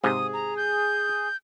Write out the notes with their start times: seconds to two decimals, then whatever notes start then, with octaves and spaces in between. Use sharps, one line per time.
0.04 G#2 C3 G#4 D#6
0.33 A#5
0.57 G6